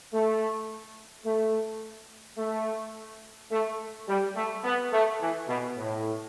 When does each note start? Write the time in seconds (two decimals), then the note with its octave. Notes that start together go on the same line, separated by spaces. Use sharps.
0.13 A3
1.25 A3
2.38 A3
3.51 A3
4.08 G3
4.36 A3
4.64 B3
4.92 A3
5.20 E3
5.48 B2
5.77 A2